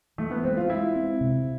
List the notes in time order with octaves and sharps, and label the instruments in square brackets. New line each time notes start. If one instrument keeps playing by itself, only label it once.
[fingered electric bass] E3 [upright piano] A3
[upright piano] B3
[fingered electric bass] G#3 [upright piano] C4
[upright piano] F4
[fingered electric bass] G#3 [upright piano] E4
[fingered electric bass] C4
C3